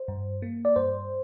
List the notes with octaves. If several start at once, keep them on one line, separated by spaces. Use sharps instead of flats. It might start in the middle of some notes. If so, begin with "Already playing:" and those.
Already playing: C5
G2
A#3
D5
G2 C5